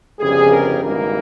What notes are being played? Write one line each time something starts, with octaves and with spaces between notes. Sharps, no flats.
G1 F2 C#3 G3 G#4
A#4
G#1 G2 E3 A#3 A#4